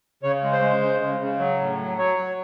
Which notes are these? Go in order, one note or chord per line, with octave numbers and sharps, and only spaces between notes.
C#3 C#5
G#3
C5
G#3
C#3
C#3
C#3
F#3
A2
F#3
F#3 C#5
F#3